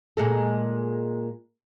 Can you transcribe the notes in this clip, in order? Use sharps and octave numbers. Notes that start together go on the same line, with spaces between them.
A#2 G#3 A4